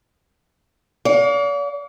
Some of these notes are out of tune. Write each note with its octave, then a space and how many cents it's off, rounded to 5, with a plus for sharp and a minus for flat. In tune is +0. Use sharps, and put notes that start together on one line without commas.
D5 -45 F5 +35